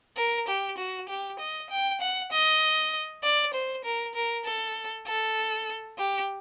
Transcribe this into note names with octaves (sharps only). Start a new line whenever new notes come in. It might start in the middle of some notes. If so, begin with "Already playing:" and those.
A#4
G4
F#4
G4
D#5
G5
F#5
D#5
D5
C5
A#4
A#4
A4
A4
G4